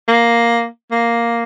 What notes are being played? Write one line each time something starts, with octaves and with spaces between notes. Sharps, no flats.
A#3
A#3